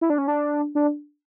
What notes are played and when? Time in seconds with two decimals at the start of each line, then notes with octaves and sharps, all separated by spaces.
0.01 E4
0.10 D4
0.18 C#4
0.28 D4
0.75 D4